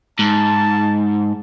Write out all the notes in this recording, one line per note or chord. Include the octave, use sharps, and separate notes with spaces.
G#2 A5